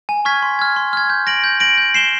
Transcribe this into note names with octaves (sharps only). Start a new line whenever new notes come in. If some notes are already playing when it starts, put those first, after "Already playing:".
G#5
C#6 F6 G#6 B6
C6
F6 G#6
C6
F6 G#6
G6
A#6 D7 F#7
G6
A#6 D7 F#7
G6
C7 E7 G7